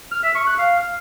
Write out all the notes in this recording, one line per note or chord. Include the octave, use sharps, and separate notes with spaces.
F6
E5
C#6
F#6
F5